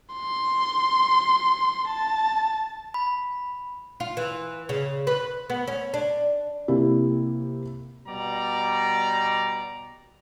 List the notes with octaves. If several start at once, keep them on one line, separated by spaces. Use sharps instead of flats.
C6
A5
B5
F4
E3
C#3
B4
B3
C#4
D4
C3 A#3 E4 G4
B2 G3 D5 A#5